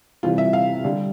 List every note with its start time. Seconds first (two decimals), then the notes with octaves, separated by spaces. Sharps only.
0.23 C3 E3 G3 F4
0.38 E5
0.53 F5
0.84 D3 G3